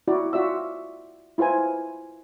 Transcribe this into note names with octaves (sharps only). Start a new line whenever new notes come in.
E4 F#4 D5
F4 F#4 D5 E5 E6
E4 F4 B4 C5 G#5